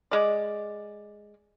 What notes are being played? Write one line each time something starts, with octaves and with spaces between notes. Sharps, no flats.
G#3 D5